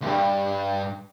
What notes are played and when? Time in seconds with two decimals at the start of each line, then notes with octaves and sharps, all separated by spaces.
0.01 D2 G2